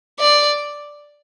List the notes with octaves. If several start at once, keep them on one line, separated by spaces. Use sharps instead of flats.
D5